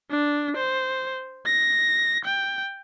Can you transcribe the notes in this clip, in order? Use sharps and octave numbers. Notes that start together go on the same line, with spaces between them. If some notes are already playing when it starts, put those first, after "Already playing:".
D4
C5
A#6
G5